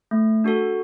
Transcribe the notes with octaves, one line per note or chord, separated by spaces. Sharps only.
A3
D4 F#4 A4